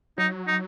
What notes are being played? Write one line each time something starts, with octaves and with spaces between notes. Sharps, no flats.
F#3 D#4
D#4